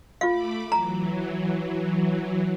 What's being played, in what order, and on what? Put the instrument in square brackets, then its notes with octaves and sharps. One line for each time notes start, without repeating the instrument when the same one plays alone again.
[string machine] A3 B5 D6 [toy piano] F4 F5
[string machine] E3 F#3 [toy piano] A#5